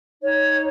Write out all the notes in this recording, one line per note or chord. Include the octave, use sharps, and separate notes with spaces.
D#4 C#5